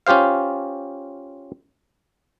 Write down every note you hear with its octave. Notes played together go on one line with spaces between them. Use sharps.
C#4 F4 G4 C5 F5